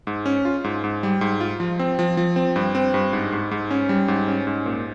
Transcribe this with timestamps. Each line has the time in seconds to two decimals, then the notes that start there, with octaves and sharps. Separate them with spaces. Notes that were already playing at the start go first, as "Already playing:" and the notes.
0.07 G#2
0.26 C#4
0.45 F4
0.64 G#2
0.84 G#2
1.03 G3
1.21 G#2
1.41 F4
1.60 F3
1.79 C4
1.99 F3
2.17 F3
2.36 C4
2.56 G2
2.75 C4
2.94 G2
3.13 G#2
3.32 G#2
3.51 G#2
3.71 C#4
3.89 G3
4.08 G#2
4.28 C#4
4.47 G#2
4.66 A#2